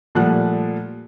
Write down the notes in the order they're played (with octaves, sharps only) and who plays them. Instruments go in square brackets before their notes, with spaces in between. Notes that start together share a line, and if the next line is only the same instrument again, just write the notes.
[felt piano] A#2 F3 G3 A3 F#5 F#6